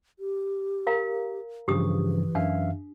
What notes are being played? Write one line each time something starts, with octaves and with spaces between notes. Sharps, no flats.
G4
A#4 F5 A#5
G2 C#3 E3 F3 G4 D#6
F#2 D4 E5 F5